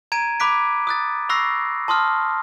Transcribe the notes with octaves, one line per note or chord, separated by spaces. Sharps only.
A#5 G#6 D7 D#7
B5 D6 F#6 B6 D7
D#6 F#6 A6
B5 C#6 E6 F#6 A#6 C7
A5 C6 D#6 F6